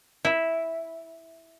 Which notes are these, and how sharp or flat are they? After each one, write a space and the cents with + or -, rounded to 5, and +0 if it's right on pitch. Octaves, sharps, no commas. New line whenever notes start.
E4 -5